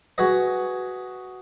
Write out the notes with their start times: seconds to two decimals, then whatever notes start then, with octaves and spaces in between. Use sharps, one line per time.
0.18 F#4 G#4 B4 D#5